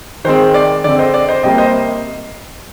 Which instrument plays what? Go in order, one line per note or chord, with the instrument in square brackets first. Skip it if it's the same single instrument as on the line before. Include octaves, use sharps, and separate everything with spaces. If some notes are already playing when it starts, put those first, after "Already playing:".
[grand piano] D#3 G#3 C4 C5
D5
D3 G#3 C4 D5
C5 D#5
D5
C5 D#5
C3 G3 A#3 D#5 G5
C5 D#5